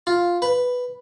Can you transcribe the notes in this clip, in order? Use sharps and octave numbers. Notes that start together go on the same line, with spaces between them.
F4
B4